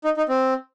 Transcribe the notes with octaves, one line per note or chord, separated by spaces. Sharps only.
D#4
D#4
C4